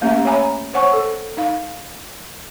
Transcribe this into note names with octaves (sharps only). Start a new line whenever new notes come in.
A3 A#3 C#4 G4 E5 A#5
C#5 E5 G#5 A#5 B5
C5 C#5 F#5 G#5 C#6
A4
D#4 F5